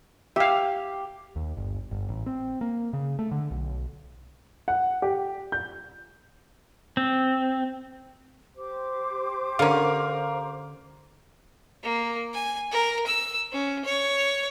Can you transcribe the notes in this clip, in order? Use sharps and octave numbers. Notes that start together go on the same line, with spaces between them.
G4 E5 F5
D#2
G1
G1
A1
C4
A#3
C#3
A3
D3
B1
F#5
G4
G6
C4
G4 C5 D6
D3 C#4 A#4 F5
A#3
G#5
A#4
E6
C#4
C#5